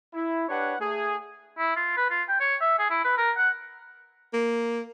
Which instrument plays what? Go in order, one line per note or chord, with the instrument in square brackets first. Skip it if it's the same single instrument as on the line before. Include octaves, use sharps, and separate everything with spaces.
[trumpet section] E4
D4 G4 B4 C#5 F#5
A3 G#4
[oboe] E4
F4
B4
F4
G5
C#5
E5
G#4
E4
B4
A#4
F#5
[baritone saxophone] A#3